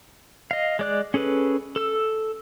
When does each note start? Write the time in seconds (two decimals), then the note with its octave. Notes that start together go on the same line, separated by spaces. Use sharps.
0.51 D#5 F5
0.79 G#3 D5 F#6
1.14 C#4 G#4 A4 B4
1.76 A4 E6